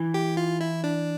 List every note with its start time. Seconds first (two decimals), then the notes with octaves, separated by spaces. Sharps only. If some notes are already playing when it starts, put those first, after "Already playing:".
Already playing: E3
0.14 G4
0.37 F4
0.61 E4
0.84 D4